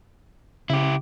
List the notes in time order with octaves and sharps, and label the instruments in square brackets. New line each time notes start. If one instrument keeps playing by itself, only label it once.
[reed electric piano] C#3 [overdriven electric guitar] E4 G4